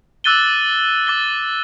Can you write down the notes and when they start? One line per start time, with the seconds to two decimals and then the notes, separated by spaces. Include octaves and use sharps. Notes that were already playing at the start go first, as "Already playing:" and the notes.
0.24 D6 E6 F#6 A6 D#7 G7
1.07 D6 A6 G7